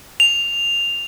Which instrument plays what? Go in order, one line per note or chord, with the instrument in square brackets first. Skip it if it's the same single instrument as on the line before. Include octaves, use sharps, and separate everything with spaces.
[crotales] F7